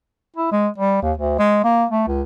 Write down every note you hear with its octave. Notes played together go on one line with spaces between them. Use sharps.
E4
G#3
G3
D#2
D2
G#3
A#3
A3
C#2